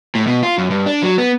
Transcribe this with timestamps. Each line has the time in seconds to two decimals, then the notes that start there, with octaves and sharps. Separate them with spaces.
0.15 A2
0.27 B2
0.43 F4
0.58 F#2
0.71 G2
0.86 D4
1.03 F#3
1.18 B3